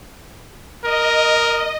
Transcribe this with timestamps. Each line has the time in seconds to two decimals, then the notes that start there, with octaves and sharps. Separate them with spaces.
0.84 A#4 D#5